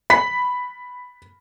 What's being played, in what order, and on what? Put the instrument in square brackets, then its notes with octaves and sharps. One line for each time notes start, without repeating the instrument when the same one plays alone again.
[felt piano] B5 B6